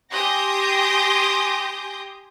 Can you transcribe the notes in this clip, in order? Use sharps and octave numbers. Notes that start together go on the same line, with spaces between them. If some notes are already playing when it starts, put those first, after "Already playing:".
G4 G#5 C6 D#6 G6 A#6